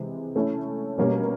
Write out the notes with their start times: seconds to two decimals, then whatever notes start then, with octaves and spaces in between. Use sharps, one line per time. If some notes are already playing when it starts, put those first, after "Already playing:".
Already playing: C3 E3 G#3
0.36 A3 C#4 E4
0.98 B2 G3 A#3 C#4